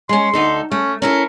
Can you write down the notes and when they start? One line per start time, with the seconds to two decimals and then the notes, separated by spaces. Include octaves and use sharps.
0.09 G#3 C#4 C6
0.34 D2 D#4 A4
0.72 A3 C#4
1.02 C#4 E4 A4 A#4